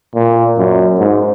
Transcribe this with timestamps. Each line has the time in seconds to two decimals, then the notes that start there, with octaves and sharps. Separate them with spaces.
0.15 A#2
0.58 F#2
0.99 G#2